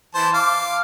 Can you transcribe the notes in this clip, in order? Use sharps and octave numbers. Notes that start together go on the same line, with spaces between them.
E3 C5 A5
F5 D6